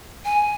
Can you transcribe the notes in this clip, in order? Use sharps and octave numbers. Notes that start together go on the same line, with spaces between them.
G#5